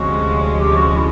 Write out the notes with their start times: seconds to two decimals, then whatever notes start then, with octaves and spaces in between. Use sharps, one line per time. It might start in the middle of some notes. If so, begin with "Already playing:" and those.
Already playing: D2 C3 F3 G#3 C#4 F#4
0.57 G4
0.77 F#4
0.96 E4